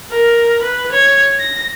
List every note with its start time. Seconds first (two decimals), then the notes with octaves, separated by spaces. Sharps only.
0.11 A#4
0.62 B4
0.92 C#5
1.40 A#6